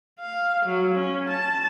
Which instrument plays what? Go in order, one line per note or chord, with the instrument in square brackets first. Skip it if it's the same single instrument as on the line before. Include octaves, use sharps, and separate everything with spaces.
[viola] F5
F#3
C#4
A5